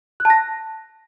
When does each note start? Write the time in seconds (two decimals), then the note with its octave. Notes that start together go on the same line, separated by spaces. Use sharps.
0.20 F#6
0.25 A5
0.30 A#6